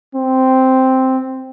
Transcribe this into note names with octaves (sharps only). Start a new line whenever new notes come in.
C4